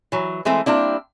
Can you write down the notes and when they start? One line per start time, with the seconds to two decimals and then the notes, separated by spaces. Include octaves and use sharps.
0.12 E3 F#3
0.45 E3 G#3 A3 C4
0.66 G3 A#3 C4 D4 E4